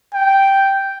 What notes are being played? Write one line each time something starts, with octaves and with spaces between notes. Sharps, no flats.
G5